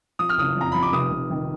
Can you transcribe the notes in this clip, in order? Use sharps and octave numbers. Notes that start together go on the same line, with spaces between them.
F3 D#6
F6
F#1 D#6
F2 A#5
F2 B5
D6
F1 D#6
F1
D#3